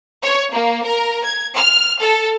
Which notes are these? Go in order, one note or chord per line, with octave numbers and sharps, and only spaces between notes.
C#5
A#3
A#4
G#6
F6
A4